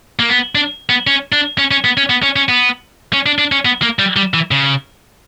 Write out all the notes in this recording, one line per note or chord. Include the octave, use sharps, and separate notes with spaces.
A#3
B3
D4
B3
C#4
D4
C#4
C#4
B3
C#4
B3
C#4
C#4
B3
C#4
D4
D4
C#4
B3
A#3
G3
G3
E3
C#3